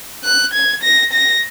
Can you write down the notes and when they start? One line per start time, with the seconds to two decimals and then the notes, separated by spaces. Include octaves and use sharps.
0.24 F#6
0.53 G#6
0.83 A#6
1.13 A#6